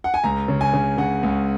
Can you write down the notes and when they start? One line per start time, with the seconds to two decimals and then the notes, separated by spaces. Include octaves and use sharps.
0.04 F#5
0.14 G#5
0.24 C#2 A#5
0.48 C#3
0.61 G#5
0.73 C#3
0.98 C#3 F#5
1.23 C#2